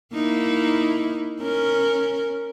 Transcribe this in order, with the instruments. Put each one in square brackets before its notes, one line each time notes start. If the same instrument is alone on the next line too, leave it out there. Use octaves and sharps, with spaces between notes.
[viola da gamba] A#3 D#4 E4
C#4 A#4